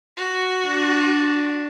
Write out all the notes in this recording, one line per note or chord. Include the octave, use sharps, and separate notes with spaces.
F#4
D4